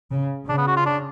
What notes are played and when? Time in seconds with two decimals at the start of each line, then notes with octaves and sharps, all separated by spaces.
0.11 C#3
0.48 C#3 D4
0.58 B3
0.67 F#4
0.76 F4
0.86 D4